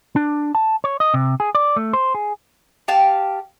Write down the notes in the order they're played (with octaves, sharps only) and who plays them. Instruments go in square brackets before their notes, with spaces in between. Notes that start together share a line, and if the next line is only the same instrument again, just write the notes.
[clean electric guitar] D4
A5
C#5
D#5
C3
G#4
D5
A3
C5
G#4
[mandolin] G4 F5 A5